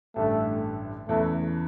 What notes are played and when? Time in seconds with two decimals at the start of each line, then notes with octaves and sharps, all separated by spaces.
0.16 A1 G2 D3 A3
1.09 E2 C#3 E3 A3